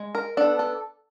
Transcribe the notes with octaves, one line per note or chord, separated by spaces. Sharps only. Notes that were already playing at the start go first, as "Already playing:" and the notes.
Already playing: G#3
A#4
B3 D4 A4
A4